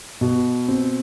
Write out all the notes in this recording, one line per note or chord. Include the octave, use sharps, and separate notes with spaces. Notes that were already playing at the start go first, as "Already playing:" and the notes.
B2
C4